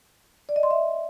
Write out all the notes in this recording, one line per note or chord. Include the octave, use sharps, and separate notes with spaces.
D5
D#5
C6
E5